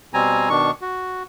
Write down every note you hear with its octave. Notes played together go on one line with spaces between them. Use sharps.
B2 G3 C4 G#5 A#5
B2 D#3 D4 C#6
F#4